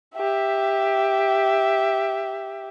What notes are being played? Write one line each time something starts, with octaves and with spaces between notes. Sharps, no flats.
G4 E5